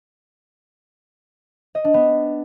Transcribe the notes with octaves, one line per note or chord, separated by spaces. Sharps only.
D#5
D4
B3